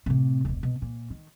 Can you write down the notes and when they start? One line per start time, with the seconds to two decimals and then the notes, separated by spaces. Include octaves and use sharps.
0.06 A2 C3
0.45 E1 D2
0.63 B2
0.82 A#2
1.10 D#3